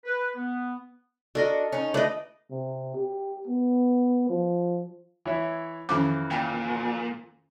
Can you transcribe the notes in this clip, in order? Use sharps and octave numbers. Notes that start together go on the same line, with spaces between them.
B4
B3
D4 F#4 A4 A#4 D#5
C#4 D#4
A3 D4 B4 D5 D#5
C3
G4
B3
F3
E3 C#5 E5
F2 D#3 E3 C#4 D6
A#2 G5 G#5